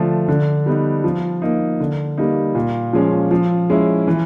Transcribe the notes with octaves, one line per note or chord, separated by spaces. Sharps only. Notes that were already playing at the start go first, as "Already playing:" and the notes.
Already playing: D3 F3 A3
D3
G3 B3 D#4
F3
A#3 D#4
D3
G3 A#3 D#4
A#2
F3 G#3 C#4
F3
G#3 C#4 E4
E3